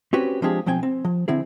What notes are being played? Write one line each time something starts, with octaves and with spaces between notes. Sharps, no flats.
C4 C#4 F#4 G4 B4
F3 G#3 C4 D4 G4 G#4
B1 F3 C4 G5 G#5
C4
F3
D3 C4 E4 G#4